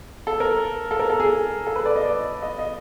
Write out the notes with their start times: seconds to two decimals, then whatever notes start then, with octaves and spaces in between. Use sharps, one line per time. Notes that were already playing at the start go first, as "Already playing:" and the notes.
0.27 A4
0.40 A#4
0.91 A4
0.99 A#4
1.10 A4
1.20 G#4
1.67 A4
1.76 B4
1.86 D5
1.96 D#5
2.05 D5
2.42 D#5
2.59 D#5